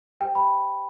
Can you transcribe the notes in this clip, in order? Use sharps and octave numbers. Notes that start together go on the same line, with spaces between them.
G4 C5 G5
B5